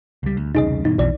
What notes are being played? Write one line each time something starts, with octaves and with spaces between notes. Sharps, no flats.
C#2 G3
D2
E1 C2 C#3 D#4 G#4 D#5
G2 B2 E3 D#4
B1 F2 B2 E3 D5